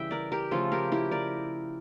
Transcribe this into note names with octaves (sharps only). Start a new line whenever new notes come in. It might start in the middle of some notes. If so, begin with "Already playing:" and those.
Already playing: C#3 E3 G3 E5 G5
A#4 D5
G4 A#4
C#3 F3 A3 F4 A4
G4 A#4
E4 G4
A#4 D5